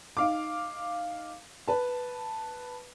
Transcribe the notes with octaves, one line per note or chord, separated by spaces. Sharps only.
D#4 F5 D6
B4 A5